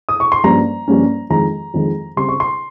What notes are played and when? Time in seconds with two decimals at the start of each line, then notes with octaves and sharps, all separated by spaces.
0.09 D#6
0.20 C#6
0.32 C6
0.44 G2 F3 A#3 C#4 A#5
0.88 G2 F3 A#3 C#4
1.30 F2 D#3 G#3 A#5
1.74 F2 D#3 G#3
2.16 C#3 G3 C4 C6
2.29 C#6
2.40 C6